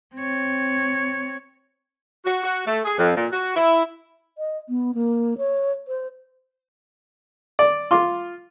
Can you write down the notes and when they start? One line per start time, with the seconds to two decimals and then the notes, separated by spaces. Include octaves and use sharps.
0.15 C4 C#5
2.25 F#4
2.44 F#4
2.67 A3
2.85 G#4
2.98 F2
3.16 A#2
3.32 F#4
3.56 E4
4.38 D#5
4.69 B3
4.95 A#3
5.38 C#5
5.88 C5
7.59 D5
7.91 F4 C6 D6